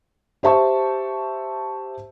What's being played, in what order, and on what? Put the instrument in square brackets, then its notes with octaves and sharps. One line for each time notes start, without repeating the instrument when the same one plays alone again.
[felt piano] G4 C5 E5 A5 C#6